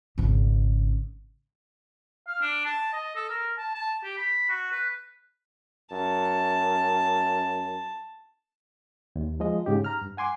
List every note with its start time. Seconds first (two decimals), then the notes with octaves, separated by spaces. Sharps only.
0.18 G#1 C#3
2.28 F5
2.41 D4
2.65 A5
2.93 D#5
3.15 A4
3.29 A#4
3.58 A5
3.75 A5
4.03 G4
4.17 B5
4.49 F#4
4.72 B4
5.92 F#2 A5
9.16 D#2
9.40 F3 G#3 D#5
9.66 G#2 C#3 G4
9.84 A#5 F6
10.02 G2
10.17 F#5 G#5 C6 D6